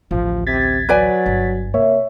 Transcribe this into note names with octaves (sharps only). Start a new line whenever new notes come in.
A1 D2 F3
C3 G#6 A6 B6
F#3 B4 D5 G#5
G1
C3 A#3 C#5 E5